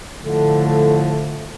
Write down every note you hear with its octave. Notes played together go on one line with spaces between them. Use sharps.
A2 D3 F3 A3